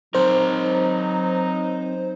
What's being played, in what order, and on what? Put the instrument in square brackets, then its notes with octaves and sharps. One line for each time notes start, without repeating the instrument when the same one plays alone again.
[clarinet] F#3 [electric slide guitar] C4 A#4 [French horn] D#4 [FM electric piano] C5